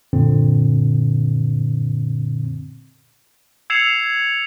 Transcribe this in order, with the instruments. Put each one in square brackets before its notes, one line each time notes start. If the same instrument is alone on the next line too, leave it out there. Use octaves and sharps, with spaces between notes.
[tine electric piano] F#2 A#2 D3 C4
[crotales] E6 G#6 C7 C#7 E7 F7